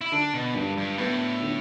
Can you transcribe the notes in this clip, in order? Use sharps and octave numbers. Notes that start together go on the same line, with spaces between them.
E4
D3 D4
B2
G2 D4
G2
A2 B3
D3